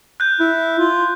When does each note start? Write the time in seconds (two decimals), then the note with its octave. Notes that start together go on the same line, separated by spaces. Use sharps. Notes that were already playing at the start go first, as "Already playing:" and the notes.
0.20 F#6 G6
0.40 E4
0.79 F4